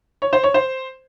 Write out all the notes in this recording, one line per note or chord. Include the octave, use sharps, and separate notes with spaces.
C#5
C5
C#5
C5